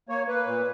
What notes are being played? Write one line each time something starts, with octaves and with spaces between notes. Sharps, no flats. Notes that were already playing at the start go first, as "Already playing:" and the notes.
A#3 C#5
A#3 B4
A#2